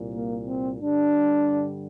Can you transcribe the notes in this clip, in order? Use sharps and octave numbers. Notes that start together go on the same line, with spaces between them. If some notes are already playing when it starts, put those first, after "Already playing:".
Already playing: C2 A#2
A#3
C4
G2 D3 G3 D4